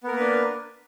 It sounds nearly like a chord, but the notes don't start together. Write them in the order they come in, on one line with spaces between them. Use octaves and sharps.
B3 A#4 A#3 B4 D4